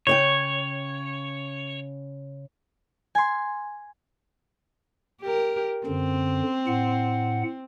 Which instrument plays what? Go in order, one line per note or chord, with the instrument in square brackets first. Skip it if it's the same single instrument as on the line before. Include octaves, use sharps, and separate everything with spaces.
[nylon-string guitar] C#3 D#5 G5 [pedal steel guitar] C#5
[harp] G#5 C6
[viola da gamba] G4 A#4
[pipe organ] F#2 D3 [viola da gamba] C4
[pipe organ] A2 F#5